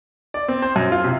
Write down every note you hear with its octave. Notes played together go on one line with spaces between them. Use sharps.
D5
C4
C5
F#2
F4
C3